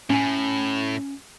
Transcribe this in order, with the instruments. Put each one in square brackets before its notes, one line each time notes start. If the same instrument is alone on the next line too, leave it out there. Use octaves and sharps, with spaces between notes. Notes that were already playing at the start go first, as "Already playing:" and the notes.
[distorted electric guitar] A2 [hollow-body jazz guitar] C#4 G#5